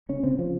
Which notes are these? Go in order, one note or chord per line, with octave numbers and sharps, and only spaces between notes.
C#3 C#4
C#3 C4
C#3 F3